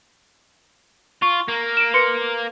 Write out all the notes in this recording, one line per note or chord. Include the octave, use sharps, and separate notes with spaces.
F4 C#6
A#3
D7 E7
B4 C6 C#7